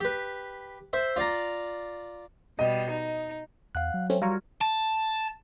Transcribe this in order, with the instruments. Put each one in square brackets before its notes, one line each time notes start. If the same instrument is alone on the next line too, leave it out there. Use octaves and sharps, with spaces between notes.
[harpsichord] G4 B4
C5 E5
F4 D5 F5 A#5
[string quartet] B2 G3 [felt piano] D#5
[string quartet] D#4
[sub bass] E2 [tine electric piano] F5 F#5 F#6
[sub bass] F#3
[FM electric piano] A3 C4 C#4
[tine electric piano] G3 F#4 [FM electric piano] F4 A#4 C#5
[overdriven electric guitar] A5